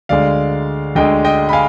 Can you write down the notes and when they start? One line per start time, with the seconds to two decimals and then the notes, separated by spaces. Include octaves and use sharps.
0.09 D2 D3 G#3 D5 F5
0.95 D2 D3 G#3 D#5 G5
1.25 D#5 G5
1.49 B5
1.53 F5 G#5